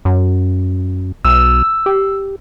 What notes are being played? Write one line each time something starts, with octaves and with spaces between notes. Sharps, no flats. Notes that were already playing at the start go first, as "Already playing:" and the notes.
F#2
B1 E6
G4